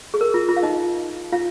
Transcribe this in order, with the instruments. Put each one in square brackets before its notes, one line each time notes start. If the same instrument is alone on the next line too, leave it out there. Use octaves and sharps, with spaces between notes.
[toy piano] G#4
A#4
F4
F4
F5
D#4 D#5
F4 F5